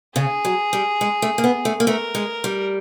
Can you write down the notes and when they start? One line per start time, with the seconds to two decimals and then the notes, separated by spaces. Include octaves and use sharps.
0.16 C#3 G#4
0.45 F#3
0.73 G3
1.01 G#3
1.22 A3
1.38 A#3
1.44 B3
1.65 A3
1.80 A#3
1.86 A3 A#4
2.15 G#3
2.44 G3